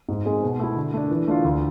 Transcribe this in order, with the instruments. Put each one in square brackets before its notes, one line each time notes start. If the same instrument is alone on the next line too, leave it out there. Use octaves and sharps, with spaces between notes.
[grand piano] G#2
G#3 C4 G#4
B2
A3 E4
D3
A3 D4
E3
A3 D4 F4
D2